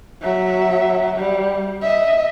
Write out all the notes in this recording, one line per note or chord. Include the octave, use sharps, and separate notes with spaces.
F#3 E5
G3
D#5 E5